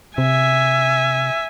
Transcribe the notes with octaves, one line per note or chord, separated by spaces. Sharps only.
C3 E5 G#5